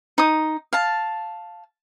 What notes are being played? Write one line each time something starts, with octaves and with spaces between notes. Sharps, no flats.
D#4 D#6
F5 A5